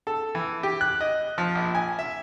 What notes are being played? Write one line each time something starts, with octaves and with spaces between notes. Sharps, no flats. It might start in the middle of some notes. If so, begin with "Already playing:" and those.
A4
E3
G4
F#6
D#5
F3
A#1
G#5
E5